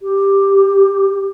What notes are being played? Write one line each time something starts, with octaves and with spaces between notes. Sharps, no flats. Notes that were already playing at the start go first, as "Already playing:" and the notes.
G4